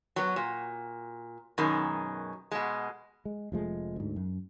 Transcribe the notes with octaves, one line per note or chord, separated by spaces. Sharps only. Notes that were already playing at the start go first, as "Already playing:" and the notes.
F#3 B3
A#2
F#2 B2 D#3 G#3
B2 G#3
G#3
F1 F3 G#3 A3
D2 G#2
F#2